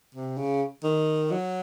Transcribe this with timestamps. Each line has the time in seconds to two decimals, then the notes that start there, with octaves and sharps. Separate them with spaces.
0.15 C3
0.37 C#3
0.84 D#3
1.31 F#3